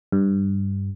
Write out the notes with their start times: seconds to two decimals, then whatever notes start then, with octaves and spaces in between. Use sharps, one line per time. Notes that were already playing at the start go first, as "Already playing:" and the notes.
0.12 G2